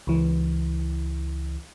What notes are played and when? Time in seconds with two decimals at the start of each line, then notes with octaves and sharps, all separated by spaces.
0.07 C#2 E3